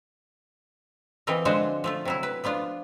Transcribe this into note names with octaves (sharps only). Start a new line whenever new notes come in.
E3 C4 F4 A#4 D#5
D3 F3 G#3 D4 F#4 C5
F3 A3 F4
C3 F#3 E4
B4
F3 B3 D4 F4